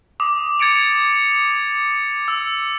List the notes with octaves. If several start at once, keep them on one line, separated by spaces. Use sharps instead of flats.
D6 D#6
G#6 A6 C#7 D7 F7
E6